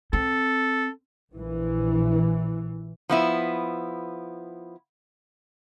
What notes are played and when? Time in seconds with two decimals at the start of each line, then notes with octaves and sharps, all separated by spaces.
0.13 C4 A4
1.33 A#1 E3
3.09 F3 B3 E4